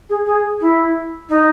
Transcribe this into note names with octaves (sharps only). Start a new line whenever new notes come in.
G#4
G#4
E4
D#4